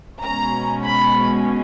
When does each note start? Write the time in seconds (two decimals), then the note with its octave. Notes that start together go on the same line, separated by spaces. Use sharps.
0.22 B2 G#3 C#4 A#5
0.84 B5